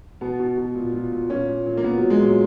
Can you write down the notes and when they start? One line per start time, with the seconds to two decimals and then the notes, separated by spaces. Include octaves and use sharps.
0.21 B2 B3
0.39 B2
0.58 B2
0.75 A#2
0.93 A#2
1.12 A#2
1.29 A#2 C#4
1.48 A#2
1.66 A#2
1.77 A#3
1.83 A#2 B3
1.98 A#2 F#3
2.10 G#3
2.19 A#2 F#3